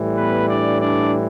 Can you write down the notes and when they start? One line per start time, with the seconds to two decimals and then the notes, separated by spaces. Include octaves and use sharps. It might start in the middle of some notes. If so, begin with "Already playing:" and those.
Already playing: A2 E3 G3
0.17 B3 B4
0.49 D4 D5
0.81 D4 D5